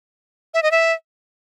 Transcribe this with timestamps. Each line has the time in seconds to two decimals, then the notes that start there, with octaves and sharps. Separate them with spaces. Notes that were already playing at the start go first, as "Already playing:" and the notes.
0.54 E5
0.63 D#5
0.71 E5